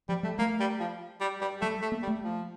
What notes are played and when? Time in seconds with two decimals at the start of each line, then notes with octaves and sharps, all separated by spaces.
0.09 F3 G3
0.23 G3 A3
0.39 A3 A#3
0.60 G3
0.80 F3
1.21 G3
1.41 G3
1.61 G3 A3
1.82 A3
1.92 A#3
2.02 G3
2.07 A3
2.23 F3